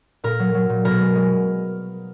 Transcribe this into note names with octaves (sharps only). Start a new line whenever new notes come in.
A#2 A#4
F#3
F#3
A#2
B2 A#4
G#3
G#3